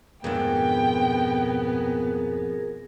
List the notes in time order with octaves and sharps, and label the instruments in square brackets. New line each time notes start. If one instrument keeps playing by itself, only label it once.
[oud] F2 G#2 D4 [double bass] B2 B3 [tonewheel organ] G#4 A#4 [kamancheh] G5